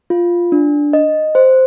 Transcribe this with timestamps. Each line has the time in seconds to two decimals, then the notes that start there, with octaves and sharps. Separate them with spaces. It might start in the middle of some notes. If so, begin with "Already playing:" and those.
0.10 F4
0.52 D4
0.93 D#5
1.35 C5